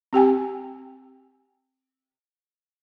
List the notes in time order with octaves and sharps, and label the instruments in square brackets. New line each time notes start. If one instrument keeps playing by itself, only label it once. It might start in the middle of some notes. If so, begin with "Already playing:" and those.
[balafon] C4 G4 G5 G#5